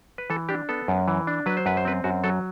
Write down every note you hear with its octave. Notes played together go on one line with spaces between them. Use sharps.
B4
E3 A4
D4 G4
B3 A4
F#2
E3
D4
F#3 B4
C5
F#2 B4
C5
C4 B4
F#2 F#4
F#3 A4